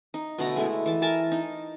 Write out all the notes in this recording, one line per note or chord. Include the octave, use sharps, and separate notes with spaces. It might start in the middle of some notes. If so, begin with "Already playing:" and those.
D#4
B2 D3 A3 A#5
G#3 A3 E4
E3 A5
A#4 G#5 A5
D#4